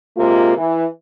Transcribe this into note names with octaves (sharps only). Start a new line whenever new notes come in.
C3 G#3 A#3 F4
E3